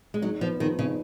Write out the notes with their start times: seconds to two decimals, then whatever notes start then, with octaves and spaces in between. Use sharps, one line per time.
0.14 G#3
0.22 F#3 D#4
0.41 F3 B3
0.60 D#3 F3
0.79 C#3 D#4